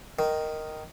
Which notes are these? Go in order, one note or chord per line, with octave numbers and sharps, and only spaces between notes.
D#3